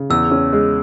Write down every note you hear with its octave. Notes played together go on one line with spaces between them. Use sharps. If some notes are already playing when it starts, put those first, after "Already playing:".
Already playing: C#3
E2 E6
C#4
G#3